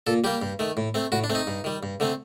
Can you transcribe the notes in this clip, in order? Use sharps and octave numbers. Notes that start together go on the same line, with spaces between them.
A#2 A4
G3 A#3 G4
G2
D#3 A3
A2
A3 C4
A2 F#4
D4
A3 C4
D#4
G2
D#3 G3
G2
D3 A3 C4